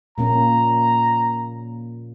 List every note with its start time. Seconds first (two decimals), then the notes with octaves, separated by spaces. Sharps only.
0.18 A#2 A#3 C#4 A#5